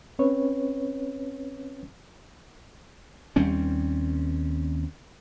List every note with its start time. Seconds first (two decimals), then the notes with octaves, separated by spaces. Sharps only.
0.19 C4 C#4 B4 C#5
3.36 D#2 G3 C4 C#4